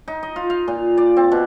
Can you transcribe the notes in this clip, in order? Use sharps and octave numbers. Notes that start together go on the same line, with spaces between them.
D#4
D#5
F4
F5
A#2
D5
C4
B2